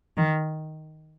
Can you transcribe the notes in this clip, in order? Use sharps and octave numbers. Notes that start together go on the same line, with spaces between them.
D#3